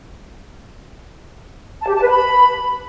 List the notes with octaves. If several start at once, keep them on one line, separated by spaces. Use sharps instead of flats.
A5
G4
A5
B4
B5